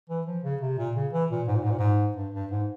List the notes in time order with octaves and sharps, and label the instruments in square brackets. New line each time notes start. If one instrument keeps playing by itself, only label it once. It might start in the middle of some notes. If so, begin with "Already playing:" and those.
[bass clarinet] E3
F3
C#3
C3
A#2
C#3
E3
A#2
G#2
A#2
G#2
A#2
G#2
G2
G2
G#2